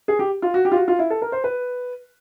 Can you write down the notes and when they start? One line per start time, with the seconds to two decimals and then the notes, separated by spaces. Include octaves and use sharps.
0.08 G#4
0.19 G4
0.42 F4
0.54 F#4
0.65 G4
0.72 F4
0.76 F#4
0.88 F4
0.99 E4
1.10 A4
1.22 A#4
1.32 C5
1.44 B4